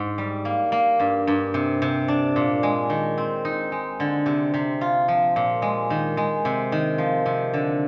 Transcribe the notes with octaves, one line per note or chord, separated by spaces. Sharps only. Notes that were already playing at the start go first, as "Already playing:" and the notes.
Already playing: G#2
G3
A#3
A#3
G2
G2
C3
C3
D4
A#2
G#3
D#3
C4
D#4
G#3
D3
C3
C3
F4
F3
A#2
G#3
D#3
G#3
C3
D#3
F3
C3
D3